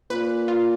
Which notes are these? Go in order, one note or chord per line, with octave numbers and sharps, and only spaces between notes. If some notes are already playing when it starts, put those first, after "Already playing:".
A#2 B4
F4